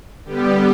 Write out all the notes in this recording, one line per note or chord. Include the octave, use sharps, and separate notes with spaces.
D3 G3 B3 G4